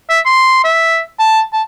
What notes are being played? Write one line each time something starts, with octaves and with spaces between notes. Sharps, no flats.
E5
C6
E5
A5
A5